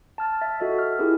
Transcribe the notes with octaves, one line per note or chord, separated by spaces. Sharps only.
A5 F6 A6
E5 A6
F#4 A4 D#5 E5
F6
E4 F4 G4 G#4 A#4